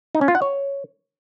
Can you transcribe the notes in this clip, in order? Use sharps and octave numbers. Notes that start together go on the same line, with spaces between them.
D#4
C#4
F4
F#5
C#5